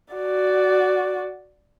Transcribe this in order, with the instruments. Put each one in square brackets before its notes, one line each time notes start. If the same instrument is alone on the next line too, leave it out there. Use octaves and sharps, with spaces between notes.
[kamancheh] F#4 D5